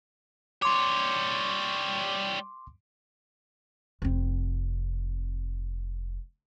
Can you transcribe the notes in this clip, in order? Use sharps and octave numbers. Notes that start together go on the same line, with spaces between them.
G3 C#5 C6 D6
F1 C4